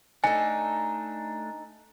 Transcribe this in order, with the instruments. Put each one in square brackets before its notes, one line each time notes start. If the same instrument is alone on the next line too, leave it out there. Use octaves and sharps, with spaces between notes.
[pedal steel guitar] A3 D4 [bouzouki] D#4 A4 [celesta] G#5